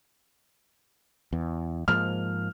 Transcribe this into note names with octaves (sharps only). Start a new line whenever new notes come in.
E2
G#2 F3 A#3 F6